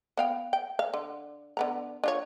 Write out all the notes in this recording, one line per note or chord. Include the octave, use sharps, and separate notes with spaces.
B3 F5 G5
G5
F5
D3
D3 B3 A#5
D4 F4 C#5